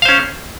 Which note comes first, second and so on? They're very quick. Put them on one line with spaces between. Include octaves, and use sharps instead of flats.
F5 C5 C#4